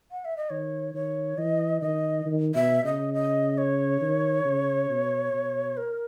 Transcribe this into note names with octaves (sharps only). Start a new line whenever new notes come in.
F#5
E5
D#5
D#3 C#5
D#3 C#5
E3 D#5
D#3 D#5
D#3
B2 E5
C#3 D#5
D#5
C#5
D#3
C#3
B2
B2
A#4